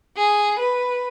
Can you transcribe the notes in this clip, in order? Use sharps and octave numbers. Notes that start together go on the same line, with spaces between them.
G#4
B4